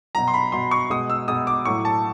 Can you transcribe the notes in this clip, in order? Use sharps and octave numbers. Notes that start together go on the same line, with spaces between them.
B2 F#3 A#5
C6
B5
B2 F#3 C6
C#6
B2 G#3 D#6
E6
B2 G#3 D#6
D6
A2 F#3 C#6
A5